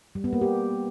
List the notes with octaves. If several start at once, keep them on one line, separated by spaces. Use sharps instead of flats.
G3
B3
A#3
G4